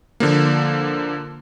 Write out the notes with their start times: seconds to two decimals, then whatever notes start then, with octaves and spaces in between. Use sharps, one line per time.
0.20 D3 F3 A#3